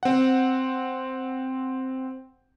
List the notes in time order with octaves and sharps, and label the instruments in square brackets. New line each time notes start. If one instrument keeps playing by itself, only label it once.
[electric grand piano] C4 F#5